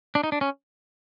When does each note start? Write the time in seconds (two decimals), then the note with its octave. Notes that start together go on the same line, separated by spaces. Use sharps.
0.15 D4
0.24 D#4
0.32 D4
0.41 C#4